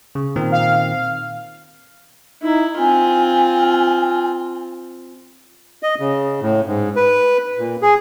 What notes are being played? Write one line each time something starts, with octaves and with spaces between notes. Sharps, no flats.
C#3
A#2 D#3 C4
F5
D#4 E4
C4 F4 G#5
D#5
C#3
A2
G#2
B4
A#2
G#4